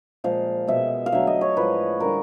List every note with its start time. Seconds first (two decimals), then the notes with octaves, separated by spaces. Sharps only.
0.24 A#2 F3 G#3 F5
0.67 B2 G#3 E5
1.06 F5
1.12 D3 F#3 A3 E5
1.27 D#5
1.41 C#5
1.56 A2 F3 G#3 B4
2.00 D3 G3 A#4